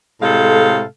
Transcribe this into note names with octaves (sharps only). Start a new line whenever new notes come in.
A2 C3 G#3 A4 F5